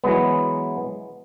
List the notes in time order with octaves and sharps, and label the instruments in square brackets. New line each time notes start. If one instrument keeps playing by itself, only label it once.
[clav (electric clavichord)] E3 F#3 G#3 B3